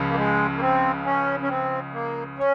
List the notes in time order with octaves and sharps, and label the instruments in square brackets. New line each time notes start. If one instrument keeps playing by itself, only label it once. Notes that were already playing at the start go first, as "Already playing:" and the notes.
Already playing: [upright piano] C#2 C#3 F3
[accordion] A#3
G#3
A#3
C4
C#4
C#4
C4
A#3
C#4